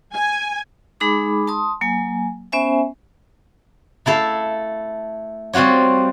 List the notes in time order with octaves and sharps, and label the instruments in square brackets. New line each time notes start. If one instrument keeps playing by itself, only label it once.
[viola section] G#5
[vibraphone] G#3 D#4 G#4 B5 D6
A5 C6 D#6
F#3 A#3 G#5
B3 C#4 C5 E5 G#5
[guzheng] A3 E4 A4 F5
G3 C4 F4 F#4 C#5